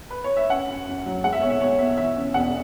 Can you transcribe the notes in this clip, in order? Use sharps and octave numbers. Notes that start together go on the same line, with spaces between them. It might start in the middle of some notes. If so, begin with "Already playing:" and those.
B4
C#5
E5
C#4 F#5
F#2
F#2
F#3
G#3 F#5
E5
B1 C#5
E5
B1 C#5
B2 E5
E3 E5
C#4
E1 F#5